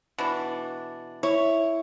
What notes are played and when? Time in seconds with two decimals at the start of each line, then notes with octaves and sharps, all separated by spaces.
0.18 B2 E3 D4
1.23 E4 C#5